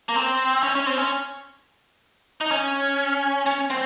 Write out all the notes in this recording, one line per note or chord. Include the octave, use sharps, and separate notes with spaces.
A#3
C4
C#4
C#4
C4
C#4
D#4
C#4
C#4
C4